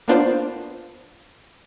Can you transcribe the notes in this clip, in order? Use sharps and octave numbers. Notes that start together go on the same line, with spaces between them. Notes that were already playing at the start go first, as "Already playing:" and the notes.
A#3 B3 D4 F4 C5